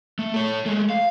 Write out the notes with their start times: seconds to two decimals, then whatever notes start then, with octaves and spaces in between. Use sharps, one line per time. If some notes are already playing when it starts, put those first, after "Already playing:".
0.19 A3
0.34 A4 C#5
0.66 G#3 A3
0.90 F5